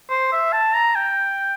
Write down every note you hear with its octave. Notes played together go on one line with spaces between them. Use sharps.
C5
E5
A5
A#5
G5